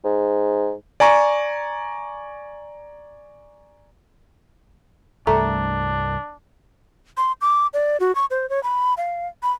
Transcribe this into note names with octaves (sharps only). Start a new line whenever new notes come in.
G#2
D5 G#5 A#5 C#6
C2 G2 A3 D4 A#5
C6
D6
D5
F#4
C#6
C5
C#5
B5
F5
B5